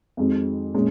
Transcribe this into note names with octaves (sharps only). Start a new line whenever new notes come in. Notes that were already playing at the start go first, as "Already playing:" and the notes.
F2 D#3 G#3 C4 F#4
A#2 G#3 C#4